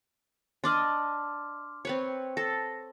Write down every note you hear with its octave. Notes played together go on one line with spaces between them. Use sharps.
D4 D5 D#5 C6 D6 F6
C4 B4 C#5
A4 A#6